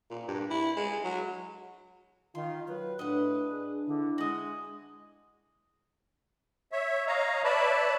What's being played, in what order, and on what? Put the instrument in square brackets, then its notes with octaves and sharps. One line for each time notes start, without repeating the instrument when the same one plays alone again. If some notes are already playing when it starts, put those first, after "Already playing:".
[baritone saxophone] A#2
G2
E4
G#3
F#3
[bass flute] D#3 [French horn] F4 [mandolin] C6
[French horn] F#3 [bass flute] B4
[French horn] A2 [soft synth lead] D4 [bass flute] B4 [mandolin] D#5 F#5
[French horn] G#4
[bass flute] D3 [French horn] E4
[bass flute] G#3 [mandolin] F#4 D#5
[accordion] C#5 E5
C#5 D#5 F5 A#5
B4 C#5 D5 E5 A5 B5